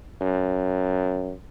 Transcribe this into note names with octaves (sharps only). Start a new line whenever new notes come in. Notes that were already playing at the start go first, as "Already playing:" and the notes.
F#2